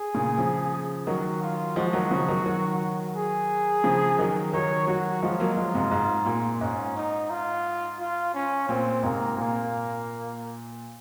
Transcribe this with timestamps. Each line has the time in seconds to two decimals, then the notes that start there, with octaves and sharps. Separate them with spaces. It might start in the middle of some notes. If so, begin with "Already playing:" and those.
Already playing: G#4
0.14 A#2 C#3
0.38 C#3 F3
1.07 D#3 F#3 F#4
1.42 F4
1.76 F3 G#3 F#4
1.93 D#3 F#3
2.11 C#3 F3
2.28 D#3 F#3
2.46 D#3 F#3
3.16 G#4
3.84 C#3 F3
4.19 D#3 F#3
4.53 D#3 F#3 C#5
4.87 D#3 F#3 F#4
5.23 F3 G#3 F4
5.40 F#3 A#3
5.57 F3 G#3
5.74 G#2 C3
5.91 G#2
6.26 A#2
6.61 G#2 C#4
6.96 D#4
7.30 F4
8.00 F4
8.34 C#4
8.69 A#2 C4
9.03 G#2 C3 A#3
9.38 A#2 A#3